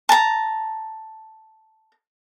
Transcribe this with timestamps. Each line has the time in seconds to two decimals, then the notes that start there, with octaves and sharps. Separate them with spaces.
0.09 A5 A#5